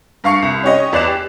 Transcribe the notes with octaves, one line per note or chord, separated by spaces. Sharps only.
G2 F5 C#6 C7 C#7
C2
C#4 G4 C#5 D#5
E2 D5 F#6 C7 E7
G4